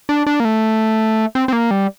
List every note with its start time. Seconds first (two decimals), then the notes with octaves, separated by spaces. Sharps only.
0.09 D4
0.27 D4
0.40 A#3
0.45 A3
1.35 C4
1.48 C4
1.53 A#3
1.71 G3